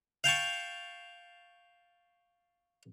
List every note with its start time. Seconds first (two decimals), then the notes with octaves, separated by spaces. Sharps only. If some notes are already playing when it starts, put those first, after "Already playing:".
0.24 F5 G5 A5 C#6